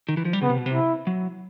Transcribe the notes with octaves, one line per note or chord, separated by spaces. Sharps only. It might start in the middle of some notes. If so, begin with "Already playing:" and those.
D#3
E3
F3
G3
C#3 B3
C3
B2
C3
E4
F#3